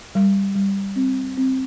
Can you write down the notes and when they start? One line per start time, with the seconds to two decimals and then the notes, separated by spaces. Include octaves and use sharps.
0.15 G3
0.56 G3
0.96 C4
1.37 C4